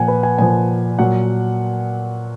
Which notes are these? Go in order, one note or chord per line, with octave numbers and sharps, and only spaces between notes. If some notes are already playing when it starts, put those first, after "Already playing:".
Already playing: A#2 F3 F#5 G#5
B4
G#5
A#2 F3 G#5
A#2 F#3 F#5